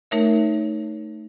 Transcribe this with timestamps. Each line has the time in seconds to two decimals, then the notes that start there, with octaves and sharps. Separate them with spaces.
0.11 A3 D#4 A#4 C#5 E5